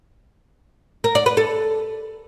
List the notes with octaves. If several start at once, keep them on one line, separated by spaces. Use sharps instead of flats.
A#4
D5
B4
A4